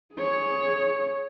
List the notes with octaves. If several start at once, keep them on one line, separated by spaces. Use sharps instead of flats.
G#4 C#5